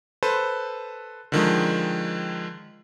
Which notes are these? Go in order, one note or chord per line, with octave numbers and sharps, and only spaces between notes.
A4 B4 C5
D3 D#3 F3 G#3